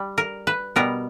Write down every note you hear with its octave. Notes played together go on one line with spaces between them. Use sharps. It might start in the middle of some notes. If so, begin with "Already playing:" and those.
Already playing: G3
A#4
B4
B2 G3 B3 A#4